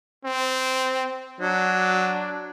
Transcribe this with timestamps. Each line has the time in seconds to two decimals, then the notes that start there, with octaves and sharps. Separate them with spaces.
0.25 C4
1.41 F#3 D4